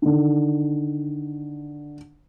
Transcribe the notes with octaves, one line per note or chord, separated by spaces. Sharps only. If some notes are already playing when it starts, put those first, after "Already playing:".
D3 D#3